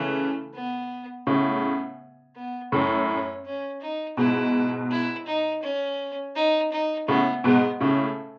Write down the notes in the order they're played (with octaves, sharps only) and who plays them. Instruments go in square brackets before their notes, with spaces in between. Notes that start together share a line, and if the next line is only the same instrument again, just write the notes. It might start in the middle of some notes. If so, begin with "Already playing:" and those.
Already playing: [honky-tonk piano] C#3 E3 [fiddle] A3
[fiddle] B3
[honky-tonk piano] A2 C#3 [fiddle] B3
[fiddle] B3
[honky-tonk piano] F#2 A2 [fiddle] C#4
[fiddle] C#4
C#4
D#4
[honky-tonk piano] G#2 B2 [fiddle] E4
[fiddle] E4
D#4
C#4
D#4
D#4
[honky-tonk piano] A2 C#3 [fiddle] B3
[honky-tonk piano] G#2 B2 [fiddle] B3
[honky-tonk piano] A2 C#3 [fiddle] A3